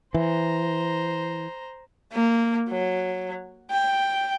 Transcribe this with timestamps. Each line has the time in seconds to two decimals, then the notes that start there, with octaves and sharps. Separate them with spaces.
0.14 E3 C5 A#5
2.13 A#3
2.69 F#3
3.71 G5